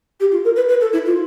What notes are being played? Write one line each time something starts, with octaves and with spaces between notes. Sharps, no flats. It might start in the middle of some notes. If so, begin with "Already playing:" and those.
G4
F4
A#4
B4
B4
A4
E4
F4